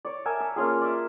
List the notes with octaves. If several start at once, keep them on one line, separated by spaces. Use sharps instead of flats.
C#5 D5
A#4 E5 G#5 A5
E6
A#3 C#4 F4 G#4
D5 E5